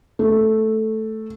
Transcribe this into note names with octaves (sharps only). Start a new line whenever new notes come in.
A3